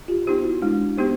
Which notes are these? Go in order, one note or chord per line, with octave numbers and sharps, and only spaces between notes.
F4 G4
B3 D#4 G4 C5
E4 F#4
G#3 D4 E4
B3 D#4 G4 C5